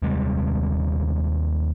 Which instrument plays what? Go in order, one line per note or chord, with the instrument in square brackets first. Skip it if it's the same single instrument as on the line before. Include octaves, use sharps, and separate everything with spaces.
[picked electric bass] D#2 C3 G3 G#3